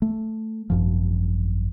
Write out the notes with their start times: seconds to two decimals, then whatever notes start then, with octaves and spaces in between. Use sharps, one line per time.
0.02 A3
0.70 G#1 F#2 F3